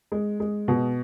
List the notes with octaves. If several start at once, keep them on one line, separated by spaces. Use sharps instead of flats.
G#3
G#3
B2